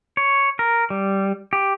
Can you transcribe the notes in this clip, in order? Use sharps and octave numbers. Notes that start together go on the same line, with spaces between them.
C#5
A#4
G3
G4